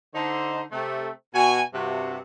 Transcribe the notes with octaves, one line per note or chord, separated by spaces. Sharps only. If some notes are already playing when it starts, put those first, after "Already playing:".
D3 D#4 C5
C3 A3
B2 F#4 G#5
G2 C3 F#4